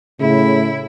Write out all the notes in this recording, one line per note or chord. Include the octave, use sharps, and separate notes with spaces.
A2 C#3 E4